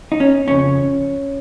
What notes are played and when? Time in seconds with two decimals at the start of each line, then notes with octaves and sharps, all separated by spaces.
0.12 D#4
0.20 C#4
0.48 F2 C#3 F3 C#4